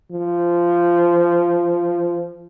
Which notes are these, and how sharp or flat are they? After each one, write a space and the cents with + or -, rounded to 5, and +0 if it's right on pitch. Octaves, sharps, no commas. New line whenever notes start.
F3 -15